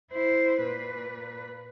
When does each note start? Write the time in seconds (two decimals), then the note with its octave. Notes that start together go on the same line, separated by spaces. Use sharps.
0.12 E4 C5
0.61 A#2 B4